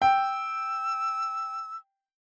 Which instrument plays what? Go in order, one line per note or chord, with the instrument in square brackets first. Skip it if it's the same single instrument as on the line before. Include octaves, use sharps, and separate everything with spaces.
[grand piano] G5 [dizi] E6